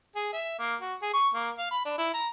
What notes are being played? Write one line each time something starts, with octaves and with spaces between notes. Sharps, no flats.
G#4
E5
A#3
F#4
G#4
C#6
A#3
F5
B5
D4
E4
A#5